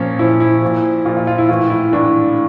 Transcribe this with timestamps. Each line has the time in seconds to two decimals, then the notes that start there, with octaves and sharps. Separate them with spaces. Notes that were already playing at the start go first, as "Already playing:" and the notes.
Already playing: A#2 F3 C#4
0.19 A#2 F3 E4
0.40 E4
0.62 A#2 F3
1.05 A#2 F3 F4
1.17 F4
1.27 F4
1.38 E4
1.49 A2 E3 F4
1.70 E4
1.93 A2 E3 D4